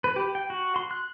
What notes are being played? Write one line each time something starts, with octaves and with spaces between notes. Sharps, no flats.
B4
G4
G5
F#4
C6
F#6